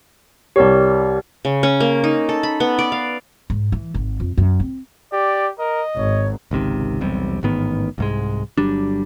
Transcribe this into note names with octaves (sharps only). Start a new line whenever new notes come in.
C2 G4 A#4 C#5 D5
C#3
C#4
A#3
D#4
A4
B5
B3
D5
F5
G#2
E3
G#1
F2
F#2
C4
G4 D5
A#4 D#5
G#1 C#5
G#1 C#2 C3 D#3
E1 B1 C3 G3
A1 G#2 D#3 B3
C2 G#2 G#3
G1 F#3 G3 D4